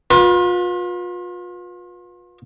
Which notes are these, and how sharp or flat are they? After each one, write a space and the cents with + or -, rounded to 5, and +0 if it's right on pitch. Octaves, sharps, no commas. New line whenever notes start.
F4 +35 B4 -25